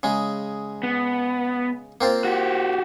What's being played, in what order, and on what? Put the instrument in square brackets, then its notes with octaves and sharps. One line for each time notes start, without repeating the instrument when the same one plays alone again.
[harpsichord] C#3 G#3
[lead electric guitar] B3
[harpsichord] A#3 C4 F4
[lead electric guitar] F#4 G4